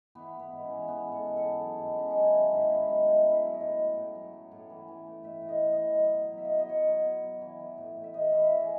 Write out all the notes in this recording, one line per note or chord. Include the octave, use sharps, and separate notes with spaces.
E3 B3
E3
B3
G#2
C#4
E3
E3 B3
G#2
A4
G#2
A4
G#2
F#3
G#2
F#3 C#4
F#3 D#4
E4
D#3 F#4
G#2 E4
G#2 B3
F#3 D#4
A2 E4
F#3
E4
F#3
D#5
A2
F#3
A2
F#3
F#3
A2
E3
E3
A2
A2 E5
A2
D#5
A2
D#5
E3
F#3
B2
F#3 E5
D#5
B2
D#5
F#3 C#5
F#3
B2
F#3
E3
E3
A2
A2
E5
A2 D#5
E3 E5
E5
E3 D#5
G#4